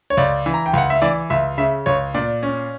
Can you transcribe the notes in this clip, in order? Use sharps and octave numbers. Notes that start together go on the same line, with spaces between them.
C#5
C#2 D5
E3
A#5
G5
C#2 F#5
E5
E3 D5
C#2 E5
C#3 E5
C#2 C#5
A#2 D5
C#4